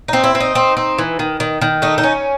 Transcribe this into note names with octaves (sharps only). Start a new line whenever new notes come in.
C4 D#4
E4
C4
D#4
C4
C4
E3
D#3
D#3
D#3
A3 D#4
D#4
C#4